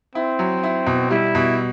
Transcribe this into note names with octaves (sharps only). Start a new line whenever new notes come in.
C4 E4
F#3
E4
B2
G3 E4
B2